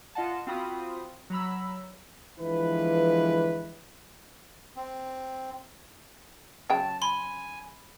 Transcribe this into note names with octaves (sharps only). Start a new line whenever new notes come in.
F4 D#5 F#5 A5
C4 F4 F#4 B5 D#6
F#3 A#5 B5 E6
D3 E3 F3 G#3 B4
C4
C#3 F#3 G5 A5
G#5 B5 C6